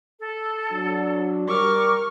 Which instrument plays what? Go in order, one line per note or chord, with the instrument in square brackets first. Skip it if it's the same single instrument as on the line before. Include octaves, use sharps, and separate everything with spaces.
[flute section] A4
[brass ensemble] F#3 D4
[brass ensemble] G3 [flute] A#4 [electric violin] C#6 F6 [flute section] D6